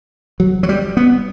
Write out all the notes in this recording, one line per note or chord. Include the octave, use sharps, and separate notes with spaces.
F#3
F#3
G3
B3